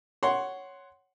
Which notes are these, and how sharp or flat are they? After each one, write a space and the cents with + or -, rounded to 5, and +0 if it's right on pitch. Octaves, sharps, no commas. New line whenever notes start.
C#5 +0 F#5 +10 C6 +0